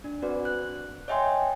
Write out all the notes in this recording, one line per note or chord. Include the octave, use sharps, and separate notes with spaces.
D4
C4 F#4 B4 D5
F#6
C#5 D#5 E5 G5 G#5 C6